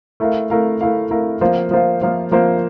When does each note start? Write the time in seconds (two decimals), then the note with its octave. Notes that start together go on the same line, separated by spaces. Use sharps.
0.20 A3 E4 A#4 F5
0.50 A3 E4 A#4 F5
0.81 A3 E4 A#4 F5
1.11 A3 E4 A#4 F5
1.41 F3 A#3 F4 C5 F5
1.71 F3 A#3 F4 C5 F5
2.02 F3 A#3 F4 C5 F5
2.31 F3 A#3 F4 C5 F5